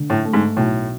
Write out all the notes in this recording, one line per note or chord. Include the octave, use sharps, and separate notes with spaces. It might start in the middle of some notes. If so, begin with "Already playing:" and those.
Already playing: D3
A2
A3
G#2
B1 A2